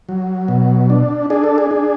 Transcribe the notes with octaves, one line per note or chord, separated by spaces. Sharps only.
F#3
B2
D4
D4 G#4
A4
G#4
D4